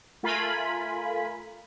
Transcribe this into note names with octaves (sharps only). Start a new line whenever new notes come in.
A3 F4 A#4 G#5 B5